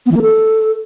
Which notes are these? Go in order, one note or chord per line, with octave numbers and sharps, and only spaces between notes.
B3
E3
A#3
A4